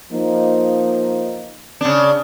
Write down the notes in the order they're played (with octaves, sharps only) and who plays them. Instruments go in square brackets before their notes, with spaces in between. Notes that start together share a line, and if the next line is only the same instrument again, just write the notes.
[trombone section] F3 A#3 D#4
[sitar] C#3 D4